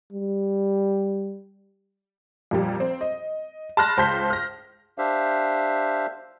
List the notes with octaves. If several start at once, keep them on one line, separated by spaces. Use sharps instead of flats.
G3
F2 A#2 G3
C4
D#5
A5 B5 C6 F6 F#6 A#6
C#2 C5 A5 C6 G6 B6
F6 A#6
D4 G4 C5 E5 F5